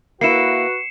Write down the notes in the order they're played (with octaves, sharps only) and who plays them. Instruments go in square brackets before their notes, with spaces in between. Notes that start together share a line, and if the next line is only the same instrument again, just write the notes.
[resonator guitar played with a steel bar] A#3 E4 [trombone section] F#4 B4 [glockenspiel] C7 C#7 E7